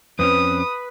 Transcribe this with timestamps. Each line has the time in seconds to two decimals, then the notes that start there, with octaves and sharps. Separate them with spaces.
0.19 F2 C4 C#4 B4 D#6